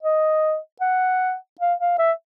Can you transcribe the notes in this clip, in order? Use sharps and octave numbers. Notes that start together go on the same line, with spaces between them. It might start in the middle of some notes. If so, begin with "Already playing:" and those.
D#5
F#5
F5
F5
E5